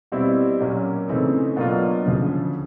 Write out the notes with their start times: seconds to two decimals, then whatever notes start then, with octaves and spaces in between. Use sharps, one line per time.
0.12 B2 G3 C4 E4
0.60 A#2 F#3 A#3 C#4
1.08 C#3 E3 A3 C4 D#4
1.56 B2 F#3 A#3 D4 F4
2.05 D2 C#3 F3